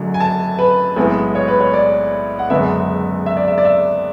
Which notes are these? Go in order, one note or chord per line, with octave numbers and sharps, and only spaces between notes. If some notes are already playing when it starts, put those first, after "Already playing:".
Already playing: F#1 F#2 D3 F#3 A3
G#5
A5
B4
B1 A2 G#3 B3
C#5
B4
C#5
D5
F#5
F#1 F#2 D3 G#3 B3 E5
E5
D5
E5
D5
E5